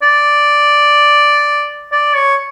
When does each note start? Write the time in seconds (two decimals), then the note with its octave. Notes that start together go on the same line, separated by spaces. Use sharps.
0.02 D5
1.92 D5
2.16 C#5